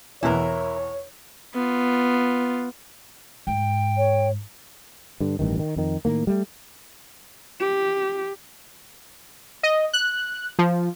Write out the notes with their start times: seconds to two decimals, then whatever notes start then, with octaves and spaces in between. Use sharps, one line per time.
0.23 E2 B2 E3 E4 A#4 C#5
1.55 B3 F4
3.47 G#2 G5
3.97 C#5
5.20 G2 D3
5.39 A1 G2 D#3
5.59 D#3
5.76 F2 D#3
6.05 A2 D#3 A#3
6.27 G3 A3
7.61 G4
9.63 D#5
9.93 F#6
10.59 F3